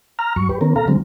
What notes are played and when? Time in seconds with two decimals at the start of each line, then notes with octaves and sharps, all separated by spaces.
0.19 A#5 F6
0.36 G2 F#3 C#6
0.49 G4 B4
0.61 D#3 B3 C#4 A#4
0.76 B2 A4 F5 A#5
0.88 D3 F#3 G#3 C4